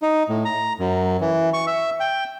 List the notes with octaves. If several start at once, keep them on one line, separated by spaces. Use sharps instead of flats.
D#4
A2
A#5
F#2
E3
C#6
E5
G5